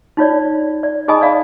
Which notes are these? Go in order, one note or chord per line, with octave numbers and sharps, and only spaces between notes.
D#4 F4 C#5 D5
D5
D#4 G#4 D#5 G#5 B5 D#6
D5 F5 B5